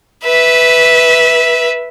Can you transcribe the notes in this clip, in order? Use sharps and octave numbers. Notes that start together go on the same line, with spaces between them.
B4 E5